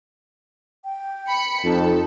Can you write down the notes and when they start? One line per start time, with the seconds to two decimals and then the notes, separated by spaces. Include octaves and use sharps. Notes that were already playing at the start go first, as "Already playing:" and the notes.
0.85 G5
1.30 B5 C#7
1.64 F2 D#4 A4